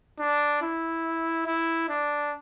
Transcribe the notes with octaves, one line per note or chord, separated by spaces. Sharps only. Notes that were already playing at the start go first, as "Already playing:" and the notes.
D4
E4
E4
D4